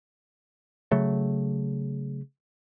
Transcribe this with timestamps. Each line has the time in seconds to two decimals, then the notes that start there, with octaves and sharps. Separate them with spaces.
0.91 C#3 F#3 A3